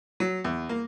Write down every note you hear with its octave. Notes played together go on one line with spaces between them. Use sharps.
F#3
E2
A#3